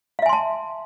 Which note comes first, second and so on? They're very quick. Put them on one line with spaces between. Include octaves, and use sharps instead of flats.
F5 E5 G#5 C6 A5